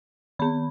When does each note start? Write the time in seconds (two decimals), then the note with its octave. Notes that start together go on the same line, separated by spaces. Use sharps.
0.39 D#3 B3 B5